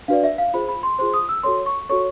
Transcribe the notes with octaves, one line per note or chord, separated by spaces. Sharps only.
D4 F#4 B4 D5 F5
E5
F5
F4 G#4 C5 B5
B5
C6
F4 G#4 C5 C6
D#6
E6
F#4 A4 C#5 C6
C#6
F#4 A4 C#5 C#6